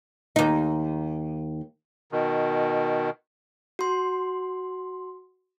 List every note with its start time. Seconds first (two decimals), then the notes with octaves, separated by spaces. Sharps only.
0.36 D#2 D#4
2.12 B2 D#3
3.79 F#4 C6